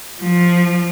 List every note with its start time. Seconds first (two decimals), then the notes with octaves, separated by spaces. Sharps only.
0.22 F3